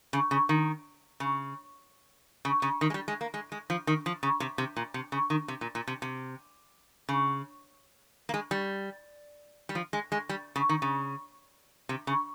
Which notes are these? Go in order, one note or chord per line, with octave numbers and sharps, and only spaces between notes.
C#3
C#3
D#3
C#3
C#3
C#3
D#3
G#3
G3
G#3
A#3
G#3
G#3
F3
D#3
F3
C#3
C3
C3
A#2
C3
C#3
D#3
C3
A#2
A#2
C3
C3
C#3
A#3
G#3
G3
G3
F3
G#3
G#3
G3
C#3
D#3
C#3
C3
C#3